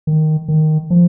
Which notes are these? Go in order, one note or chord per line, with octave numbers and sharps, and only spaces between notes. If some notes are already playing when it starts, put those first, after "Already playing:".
D#3
D#3
F3